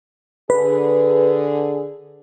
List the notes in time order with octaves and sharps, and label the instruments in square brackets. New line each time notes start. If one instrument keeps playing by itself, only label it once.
[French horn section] D3 G#4 [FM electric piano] B4